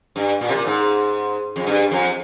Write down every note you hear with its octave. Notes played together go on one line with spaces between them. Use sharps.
G2
A#2
C3
A#2
G#2
F2
G2
F2